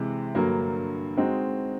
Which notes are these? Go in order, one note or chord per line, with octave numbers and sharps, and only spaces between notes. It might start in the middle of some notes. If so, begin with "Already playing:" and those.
Already playing: C3 E3 G#3
G2 D3 F#3 A#3
G#3 C4 D#4 F#4